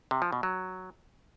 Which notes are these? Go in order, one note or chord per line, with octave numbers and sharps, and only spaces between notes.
C3
F3
B2
F#3